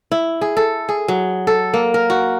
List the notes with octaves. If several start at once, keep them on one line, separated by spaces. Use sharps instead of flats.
E4
G#4
A4
G#4
F#3
A4
A#3
A#4
F#4